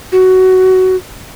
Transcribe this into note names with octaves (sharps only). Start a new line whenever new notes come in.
F#4